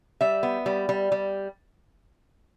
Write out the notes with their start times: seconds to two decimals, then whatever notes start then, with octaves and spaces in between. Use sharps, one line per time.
0.21 G3 E5
0.43 B3
0.66 G3
0.89 G3
1.12 G3